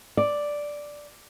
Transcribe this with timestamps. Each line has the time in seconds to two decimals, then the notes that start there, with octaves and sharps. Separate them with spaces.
0.17 D5